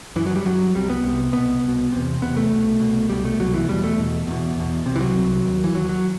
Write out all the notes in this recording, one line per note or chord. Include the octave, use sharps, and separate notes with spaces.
F#2 E3
F#3
G3
F#2 F#3
C2 C3 G3
B3
C2 C3
C2 B2 B3
C2 B2
E2 C3
E2 C3 B3
A3
C2 B2
C2 B2
C2 B2 G3
A3
C2 B2 F#3
E3
E2 B2 G3
A3
E2 B2
E2 B2
E2 B2
C2 C3
E3
F#3
C2 C3
D#2
E3
D#2 F#3
F#3